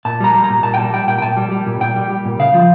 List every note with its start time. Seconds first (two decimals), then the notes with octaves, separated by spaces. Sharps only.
0.05 A#2 A5
0.20 G3 A#5
0.34 G3
0.44 A#5
0.50 A#2
0.63 A#2 A5
0.74 G5
0.78 G3 A5
0.93 G3 G5
1.07 A#2 G5
1.18 G5
1.22 A#2 A5
1.37 G3
1.51 G3
1.66 A#2
1.81 A#2 G5
1.96 G3
2.10 G3
2.25 A#2
2.39 C#3 F5
2.54 F3